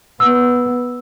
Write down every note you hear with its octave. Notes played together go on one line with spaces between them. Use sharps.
B3 E6